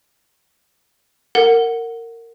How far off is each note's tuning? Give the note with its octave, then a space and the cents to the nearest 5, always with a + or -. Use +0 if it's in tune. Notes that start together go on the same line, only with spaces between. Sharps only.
A#4 -20 F#5 +0